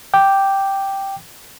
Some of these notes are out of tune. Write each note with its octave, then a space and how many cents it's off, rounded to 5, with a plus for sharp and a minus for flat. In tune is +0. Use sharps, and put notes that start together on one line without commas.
G5 +0 D6 +0